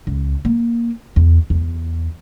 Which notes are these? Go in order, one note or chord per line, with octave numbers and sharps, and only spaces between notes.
C#2
A#3
E2
E2